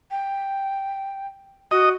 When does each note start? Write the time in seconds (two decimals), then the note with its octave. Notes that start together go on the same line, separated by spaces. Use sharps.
0.11 G5
1.71 F#4 D#5